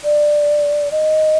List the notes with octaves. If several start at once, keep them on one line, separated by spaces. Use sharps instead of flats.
D5
D#5